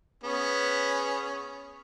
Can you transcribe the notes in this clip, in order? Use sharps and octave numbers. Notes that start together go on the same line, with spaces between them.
B3 C#4 G#4